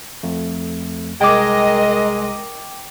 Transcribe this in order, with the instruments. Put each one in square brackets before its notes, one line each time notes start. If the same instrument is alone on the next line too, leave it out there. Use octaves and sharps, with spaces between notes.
[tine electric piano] F2 A3
[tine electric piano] C2 [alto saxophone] G#3 [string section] A#4 D#5 [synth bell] G5 D6